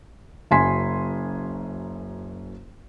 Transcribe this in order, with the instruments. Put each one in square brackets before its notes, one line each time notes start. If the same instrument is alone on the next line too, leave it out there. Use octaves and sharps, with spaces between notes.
[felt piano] F#1 F#2 G#5 C6 B6